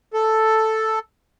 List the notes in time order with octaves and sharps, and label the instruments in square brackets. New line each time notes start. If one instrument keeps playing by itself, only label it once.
[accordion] A4